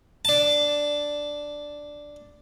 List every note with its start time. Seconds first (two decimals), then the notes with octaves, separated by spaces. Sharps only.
0.25 D4 A5